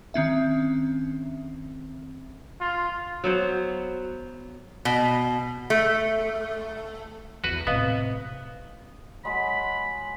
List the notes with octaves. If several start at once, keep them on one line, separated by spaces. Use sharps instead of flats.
D#3 C4 C#4 E5
F4
F#3 B3 C5
B2
A3
E2 F#4 B4
A2 C3 B3 B4 D#5 F5
F#3 G#3 B5